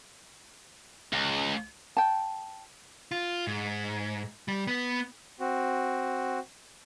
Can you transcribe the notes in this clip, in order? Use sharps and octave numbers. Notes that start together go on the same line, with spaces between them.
C#2
G5 A5
F4
G#2
G3
B3
C4 F#4